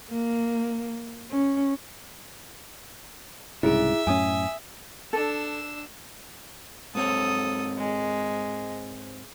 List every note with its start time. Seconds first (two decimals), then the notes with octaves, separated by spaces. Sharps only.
0.11 A#3
1.31 C#4
3.63 C2 G#2 C#3 E4 G#4 E5
4.07 F#2 A2 C#4 G#5 D#6
5.13 D4 A4 E6
6.95 G#2 C4 A4 C#5 D#6
7.78 G#3